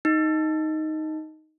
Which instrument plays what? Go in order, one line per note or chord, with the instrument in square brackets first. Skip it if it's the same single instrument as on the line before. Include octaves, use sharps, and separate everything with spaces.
[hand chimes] D#4